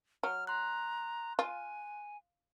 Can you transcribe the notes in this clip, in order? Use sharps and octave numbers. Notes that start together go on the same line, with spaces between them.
F#3 F6
A#5 C6 F#6
F4 G#5